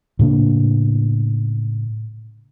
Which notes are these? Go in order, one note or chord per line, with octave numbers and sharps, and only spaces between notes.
A2 C#3 A#3 D4